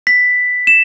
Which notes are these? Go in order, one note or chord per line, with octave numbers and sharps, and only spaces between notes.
B6
E7